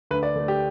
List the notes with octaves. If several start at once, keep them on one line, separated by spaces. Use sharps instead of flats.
D2 B4
D5
D3 A3
G4